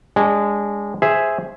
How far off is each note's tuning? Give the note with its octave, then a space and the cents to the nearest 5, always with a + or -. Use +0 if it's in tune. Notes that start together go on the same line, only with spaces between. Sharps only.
G#3 -20 D4 -30
G#4 +0 C5 +0 E5 +0